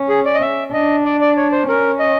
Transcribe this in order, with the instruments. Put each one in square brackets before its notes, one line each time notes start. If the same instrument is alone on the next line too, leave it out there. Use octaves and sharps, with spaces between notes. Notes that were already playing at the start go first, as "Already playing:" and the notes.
Already playing: [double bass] C#4
[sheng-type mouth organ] G#4
D5
D#5
E5
[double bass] D4 [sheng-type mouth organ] D#5
[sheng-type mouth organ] D5
D5
C#5
C5
[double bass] C#4 [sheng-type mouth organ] A#4
[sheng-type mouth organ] D#5